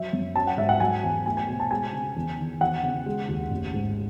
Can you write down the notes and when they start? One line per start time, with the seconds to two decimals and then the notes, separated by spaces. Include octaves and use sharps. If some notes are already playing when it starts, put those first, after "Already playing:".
Already playing: F#3 E5
0.13 F#2
0.35 C#4 A5
0.47 F#5
0.58 G#2 E5
0.69 F#5
0.80 F#3 G#5
1.03 E2
1.26 A3 G#5
1.37 G#5
1.48 B2
1.60 A5
1.71 G#3 G#5
1.93 C#3
2.16 E2
2.38 D#3
2.61 E2 F#5
2.83 C#3
3.06 G#3
3.28 D#2
3.51 A1
3.74 G#2